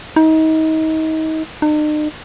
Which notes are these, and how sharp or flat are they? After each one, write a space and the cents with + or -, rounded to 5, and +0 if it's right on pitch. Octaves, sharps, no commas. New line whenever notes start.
D#4 +30
D#4 -45